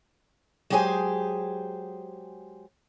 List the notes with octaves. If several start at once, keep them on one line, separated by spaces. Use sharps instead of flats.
F#3 G#3 G4 G#4 C5 G#5